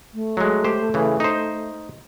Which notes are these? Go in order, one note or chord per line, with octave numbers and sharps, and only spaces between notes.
A3
F#3 G#3
G4 C5
C#3 E3
D#4 C5